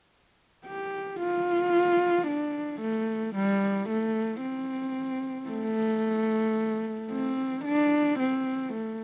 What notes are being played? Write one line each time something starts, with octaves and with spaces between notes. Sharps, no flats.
G4
F4
D4
A3
G3
A3
C4
A3
C4
D4
C4
A3